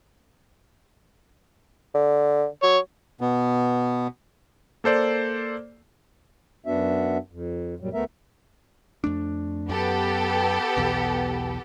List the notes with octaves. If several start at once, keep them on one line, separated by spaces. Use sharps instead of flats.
D3
F#3 C#5
B2 B3
A#3 A4 C5 D5
F#2 B3 D4 F#4 E5
F2
F#2 A#2 F#3 G3
D2 A3 B3 A#4 E5
F2 A3 D4
F#2 B3 G4 A4
B1 E2 B2